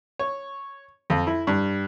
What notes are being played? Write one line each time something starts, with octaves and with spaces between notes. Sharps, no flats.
C#5
F2
E4
G2